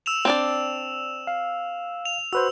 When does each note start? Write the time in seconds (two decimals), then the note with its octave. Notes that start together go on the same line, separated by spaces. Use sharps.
0.06 E6 E7 F7
0.25 C4 D4 D5
1.27 F5
2.05 F7
2.33 F#4 B4 C5 E6